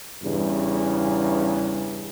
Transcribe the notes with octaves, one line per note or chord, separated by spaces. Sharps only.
E2 G2 C#3